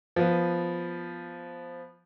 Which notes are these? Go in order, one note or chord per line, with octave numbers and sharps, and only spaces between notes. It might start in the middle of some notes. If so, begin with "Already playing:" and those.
F3 B3